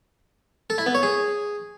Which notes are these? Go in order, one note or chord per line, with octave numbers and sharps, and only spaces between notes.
A4
E4
B3
C#5
G#4